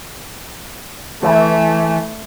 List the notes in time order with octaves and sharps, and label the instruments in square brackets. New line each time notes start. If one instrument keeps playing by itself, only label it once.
[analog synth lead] E3 [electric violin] A3